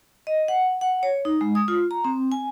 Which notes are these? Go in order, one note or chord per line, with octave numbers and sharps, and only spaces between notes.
D#5
F#5
F#5
C#5
D#4
G#3
D#6
F4
A#5
C4
G#5